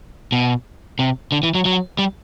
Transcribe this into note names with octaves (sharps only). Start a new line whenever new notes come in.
B2
C3
D3
E3
F#3
F#3
G3